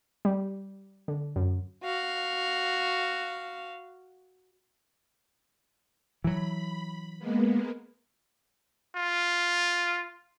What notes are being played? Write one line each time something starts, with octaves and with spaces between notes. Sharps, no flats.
G3
D3
F#2
F#4 F5
E3 F#3 B5
G#3 A#3 B3
F4